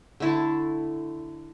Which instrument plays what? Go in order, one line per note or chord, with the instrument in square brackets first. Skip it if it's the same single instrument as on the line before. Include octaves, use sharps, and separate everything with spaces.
[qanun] D3 A3 E4 A5